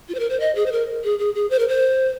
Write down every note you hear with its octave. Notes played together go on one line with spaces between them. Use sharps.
F4
C5
A#4
C5
D#5
G#4
C5
A#4
G#4
G#4
G#4
C5
A#4
C5